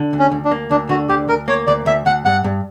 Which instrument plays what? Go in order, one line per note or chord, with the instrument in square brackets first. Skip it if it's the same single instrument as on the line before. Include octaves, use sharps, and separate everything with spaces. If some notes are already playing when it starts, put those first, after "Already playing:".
Already playing: [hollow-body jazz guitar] D3
D2
[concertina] C#4
[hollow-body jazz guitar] D2
[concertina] D4
[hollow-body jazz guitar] A#3
[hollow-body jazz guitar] D2 [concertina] D4
[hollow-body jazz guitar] D3 [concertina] F#4
[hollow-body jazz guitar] D2 [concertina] G4
[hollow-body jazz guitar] D2 [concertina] A#4
[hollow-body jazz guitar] A#3 [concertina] C#5
[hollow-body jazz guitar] D2 [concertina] D5
[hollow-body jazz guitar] D2 [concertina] E5
[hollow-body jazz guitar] D2 [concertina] F#5
[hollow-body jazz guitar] G2 [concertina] F#5
[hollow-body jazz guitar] G2